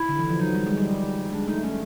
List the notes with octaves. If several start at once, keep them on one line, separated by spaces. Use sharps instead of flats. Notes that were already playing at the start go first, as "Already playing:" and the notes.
Already playing: E4
D3
E3
F3
F#3 D#4
G3
G#3
G3
G#3 D4
A3 D#4
A3 C#4